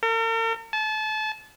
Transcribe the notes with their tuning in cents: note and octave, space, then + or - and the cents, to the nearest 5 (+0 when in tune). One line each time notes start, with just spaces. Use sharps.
A#4 -45
A5 -30